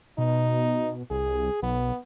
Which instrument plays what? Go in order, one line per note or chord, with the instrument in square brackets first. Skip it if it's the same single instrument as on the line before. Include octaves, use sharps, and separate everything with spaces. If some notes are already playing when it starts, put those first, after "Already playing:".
[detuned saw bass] B2 [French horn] D#4
[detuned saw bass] C2 [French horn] G#4
[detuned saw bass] B1 [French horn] B3